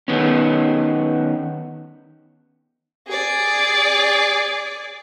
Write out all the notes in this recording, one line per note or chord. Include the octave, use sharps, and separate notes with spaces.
D#3 B3 C#4
G#4 D5